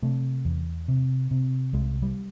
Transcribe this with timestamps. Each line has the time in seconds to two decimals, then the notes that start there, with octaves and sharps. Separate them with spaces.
0.02 C3 A3
0.45 E2
0.88 C3
1.31 C3
1.73 C2 G#3
2.02 G3